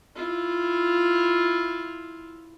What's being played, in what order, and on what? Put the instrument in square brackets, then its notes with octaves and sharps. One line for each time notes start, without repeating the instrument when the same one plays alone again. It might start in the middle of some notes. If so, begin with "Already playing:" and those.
[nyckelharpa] E4 F4